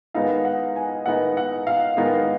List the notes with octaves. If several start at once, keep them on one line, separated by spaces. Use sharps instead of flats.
D#3 G#3 B3 D#4 F5
F#5
G#5
D#3 G#3 B3 D#4 F#5
F#5
F5
D#3 G#3 B3 D#4